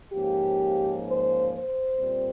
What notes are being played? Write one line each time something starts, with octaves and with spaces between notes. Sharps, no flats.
G#2 F3 A#3 C#4 G4
C5
C5
A#2 G3 C4